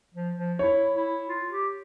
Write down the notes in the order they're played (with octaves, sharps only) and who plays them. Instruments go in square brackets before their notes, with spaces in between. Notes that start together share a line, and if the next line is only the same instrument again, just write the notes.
[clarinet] F3
F3
[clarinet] E4 [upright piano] C#5
[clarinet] E4
F4
G4